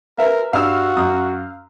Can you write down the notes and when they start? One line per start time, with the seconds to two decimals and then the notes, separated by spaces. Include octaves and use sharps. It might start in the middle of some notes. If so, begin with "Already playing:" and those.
0.18 A#4 B4 E5 F5
0.53 G2 F#4 F5 D#6 E6
0.97 F#2 D#6